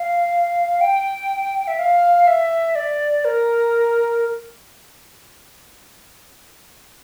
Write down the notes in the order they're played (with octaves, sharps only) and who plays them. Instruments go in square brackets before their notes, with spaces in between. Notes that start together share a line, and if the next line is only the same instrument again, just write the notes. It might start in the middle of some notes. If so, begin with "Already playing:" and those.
Already playing: [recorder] F5
G5
E5
F5
E5
D5
A#4